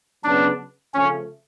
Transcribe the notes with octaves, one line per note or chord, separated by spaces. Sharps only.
C#3 F#3 B3 D4
C#3 F3 A3 C#4